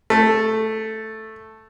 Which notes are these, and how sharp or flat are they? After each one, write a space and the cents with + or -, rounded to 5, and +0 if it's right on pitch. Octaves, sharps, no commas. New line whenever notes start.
A3 +0